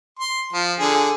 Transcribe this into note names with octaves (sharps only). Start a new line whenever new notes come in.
C6
F3
D3 G#4